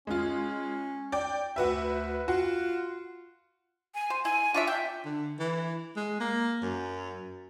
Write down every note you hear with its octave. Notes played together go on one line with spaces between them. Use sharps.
G#3 C#4 F4
D5 G5
D2 F#4 B4 E5
F4 F#4
G#5
C5
E4 G#5
D4 F4 C#5 E5
E5 G5
D3
E3
G#3
A#3
F#2